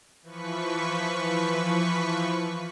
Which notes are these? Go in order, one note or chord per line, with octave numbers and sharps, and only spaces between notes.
E3 F3 B4 C#6 B6